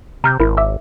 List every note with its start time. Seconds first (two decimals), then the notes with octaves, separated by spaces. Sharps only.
0.24 C3 A#5 F6 G6
0.40 G#1 E4 A#4
0.57 E5 D6 E6